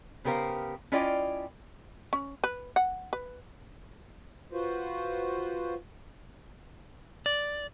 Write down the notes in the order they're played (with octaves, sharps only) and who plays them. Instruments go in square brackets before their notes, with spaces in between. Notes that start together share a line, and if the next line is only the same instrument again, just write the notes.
[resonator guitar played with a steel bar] C#3 B3 G4 A#4 C5 F5
C#4 E4 F4 D5 D#5 G5
[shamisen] C#4
B4
F#5
B4
[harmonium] F4 F#4 B4 C5
[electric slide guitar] D5